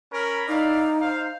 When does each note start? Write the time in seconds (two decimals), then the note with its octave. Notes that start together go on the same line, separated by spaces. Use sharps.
0.12 C#4 A#4 B5
0.48 D#4 E4 D5 F5
1.01 C5 F5